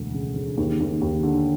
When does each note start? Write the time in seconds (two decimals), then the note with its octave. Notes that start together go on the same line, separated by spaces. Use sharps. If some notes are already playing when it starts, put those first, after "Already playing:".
Already playing: E1 D2
0.14 C#3
0.36 C#3
0.57 D#2
0.80 D#2
1.01 D#2
1.23 D3